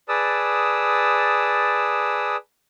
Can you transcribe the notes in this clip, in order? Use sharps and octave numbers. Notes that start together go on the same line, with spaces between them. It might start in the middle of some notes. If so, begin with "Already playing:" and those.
G#4 B4 D5 A5 D#6 E6